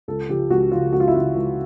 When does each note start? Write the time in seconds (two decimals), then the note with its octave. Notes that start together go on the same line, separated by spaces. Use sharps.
0.08 C#2 A4
0.29 C#3 F3 G4
0.50 C#2 F#4
0.72 C#3 F3 F4
0.93 C#2 F#4
1.00 F4
1.08 E4
1.14 C#3 F3 F4
1.35 C#2